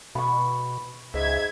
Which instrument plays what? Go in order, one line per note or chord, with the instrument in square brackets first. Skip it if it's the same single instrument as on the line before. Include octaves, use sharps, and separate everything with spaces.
[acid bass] B2 [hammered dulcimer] B5 C#6
[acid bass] C#2 [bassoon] G#2 [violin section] E5 G#6